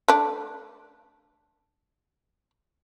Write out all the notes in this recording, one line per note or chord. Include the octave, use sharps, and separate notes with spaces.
A3 D4